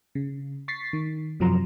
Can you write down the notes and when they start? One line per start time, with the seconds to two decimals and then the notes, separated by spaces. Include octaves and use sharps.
0.15 C#3
0.68 C#6 A6 B6 C7
0.93 D#3
1.40 F#2 C3 F3 F#3 A#5 C6